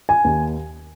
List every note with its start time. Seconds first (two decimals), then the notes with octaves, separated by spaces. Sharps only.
0.09 G#5
0.25 D#2